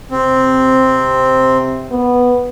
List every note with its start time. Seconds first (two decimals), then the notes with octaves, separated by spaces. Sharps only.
0.11 C3 C4
1.91 B3